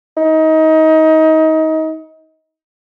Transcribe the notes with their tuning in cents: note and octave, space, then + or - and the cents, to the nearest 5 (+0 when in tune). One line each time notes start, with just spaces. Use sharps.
D#4 +25